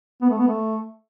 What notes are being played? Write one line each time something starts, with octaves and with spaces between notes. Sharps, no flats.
B3
A3
B3
A3